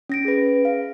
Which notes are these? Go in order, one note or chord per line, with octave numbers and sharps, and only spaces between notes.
C#4 A#6 D7
G#4 B4
F5